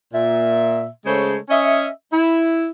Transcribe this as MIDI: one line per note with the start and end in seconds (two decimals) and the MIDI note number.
0.14 0.87 46
0.14 0.87 76
1.06 1.36 49
1.06 1.36 56
1.06 1.36 57
1.06 1.36 69
1.06 1.36 72
1.06 1.36 73
1.49 1.88 61
1.49 1.88 75
1.49 1.88 76
2.13 2.68 64